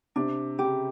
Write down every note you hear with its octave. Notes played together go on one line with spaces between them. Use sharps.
C3 D4
C#3 G4